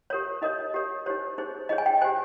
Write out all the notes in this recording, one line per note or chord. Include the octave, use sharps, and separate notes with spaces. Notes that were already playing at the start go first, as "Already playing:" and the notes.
G4 A#4 C#5
D#4 A#4 C#5 D#5
G4 A#4 C#5
D#4 G4 C5 C#5
D#4 G#4 C5
D#4 G#4 C#5 D#5
G#5
G5
G4 C5 G#5